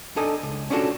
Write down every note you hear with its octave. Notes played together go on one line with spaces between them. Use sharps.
D4 D#4 A4 D#5 G#5
C#2
C#4 D4 F4 F#4 A4 C#5